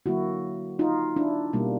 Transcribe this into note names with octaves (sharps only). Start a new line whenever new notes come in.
D3 F#3 A#3 E4 F#4
D#4 F4
D4 E4
B2 G3 A#3